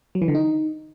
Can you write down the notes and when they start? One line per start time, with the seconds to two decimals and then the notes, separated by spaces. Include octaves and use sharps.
0.15 F#3
0.22 E3
0.28 D3
0.35 D#4